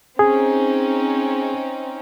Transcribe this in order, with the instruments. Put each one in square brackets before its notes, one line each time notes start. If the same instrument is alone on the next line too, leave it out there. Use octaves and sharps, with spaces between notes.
[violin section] C4 C#4 D#4 [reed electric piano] G#4